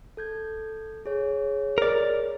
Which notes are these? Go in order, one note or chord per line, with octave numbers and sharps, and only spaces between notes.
A4 G6 G#6
G#4 C#5
A#4 D5